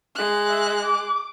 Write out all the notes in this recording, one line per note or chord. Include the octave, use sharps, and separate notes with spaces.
G#3 F#6
E5
D6